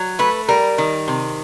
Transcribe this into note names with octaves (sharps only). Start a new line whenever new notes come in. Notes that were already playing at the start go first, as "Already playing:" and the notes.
Already playing: F#3
A3 B4
G3 A#4
D#3
C3